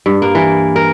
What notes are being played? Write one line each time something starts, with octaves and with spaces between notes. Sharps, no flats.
G2
A#3
E3
A#4